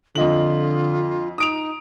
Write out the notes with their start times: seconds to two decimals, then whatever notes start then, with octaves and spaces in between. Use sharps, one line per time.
0.15 F2 D3 F4 D#5 F#7
1.38 D#4 D#6 D7 F7